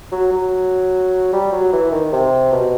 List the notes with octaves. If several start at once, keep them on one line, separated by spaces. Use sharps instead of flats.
F#3
F#3
G3
F#3
E3
D#3
C3
B2